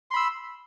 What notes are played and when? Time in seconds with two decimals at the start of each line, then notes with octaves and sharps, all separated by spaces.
0.11 C6
0.14 B5
0.16 E6